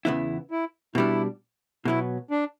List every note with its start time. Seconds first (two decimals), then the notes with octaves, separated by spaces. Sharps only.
0.05 E2 C#3 E3 B3 E4
0.51 E4
0.95 B2 G3 D4 E4
1.85 B2 F#3 B3 E4
2.31 D4